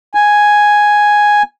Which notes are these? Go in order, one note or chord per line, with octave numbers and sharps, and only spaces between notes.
G#5